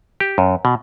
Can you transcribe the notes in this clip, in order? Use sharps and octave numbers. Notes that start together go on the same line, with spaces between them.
G4
F#2
B2